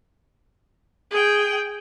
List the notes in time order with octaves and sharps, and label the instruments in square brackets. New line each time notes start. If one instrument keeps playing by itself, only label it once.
[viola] G#4 G5